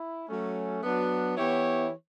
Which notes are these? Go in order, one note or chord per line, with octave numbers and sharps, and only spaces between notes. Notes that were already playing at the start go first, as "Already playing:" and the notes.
Already playing: E4
F#3 A3 C#4
F#3 B3 D4
E3 B3 E4 G4 C#5